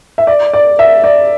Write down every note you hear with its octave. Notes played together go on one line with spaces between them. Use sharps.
E5
D5
D5
E5
D5